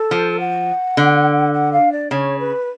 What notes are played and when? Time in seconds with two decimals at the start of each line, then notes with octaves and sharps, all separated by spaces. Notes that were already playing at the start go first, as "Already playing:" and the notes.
Already playing: A4
0.11 F3
0.40 F#5
0.97 D3
1.53 F#5
1.72 F5
1.92 D5
2.11 C#3 C#5
2.39 B4